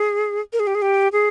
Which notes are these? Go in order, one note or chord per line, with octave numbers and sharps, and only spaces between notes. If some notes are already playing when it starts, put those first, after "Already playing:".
Already playing: G#4
A#4
G#4
G4
G#4
G4
G#4